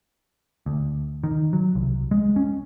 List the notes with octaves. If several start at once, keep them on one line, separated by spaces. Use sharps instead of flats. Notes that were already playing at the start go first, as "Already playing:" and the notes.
D2
D#3
F#3
C2
G#3
C#4